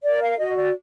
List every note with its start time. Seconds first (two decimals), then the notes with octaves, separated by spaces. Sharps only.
0.04 A#4 D5
0.21 F5
0.39 F#4 D#5
0.56 D5